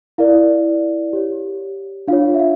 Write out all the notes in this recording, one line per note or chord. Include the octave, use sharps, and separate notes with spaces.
E4 A#4 D5 F5
G4 C#5
D4 F4 C#5 F5
E5
F5